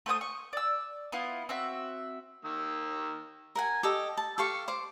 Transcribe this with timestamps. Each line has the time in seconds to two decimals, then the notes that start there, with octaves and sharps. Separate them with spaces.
0.06 A3 C5 G5 D#6
0.21 C#6
0.53 D5 E6
1.12 B3 E4 F4
1.49 C4 F#4 E5
2.45 D#3 A#3 E6
3.55 A#4 F#5 G#5
3.83 G4 A4 D#5
4.17 A5
4.38 G4 A4 F5 C#6
4.68 C5 D6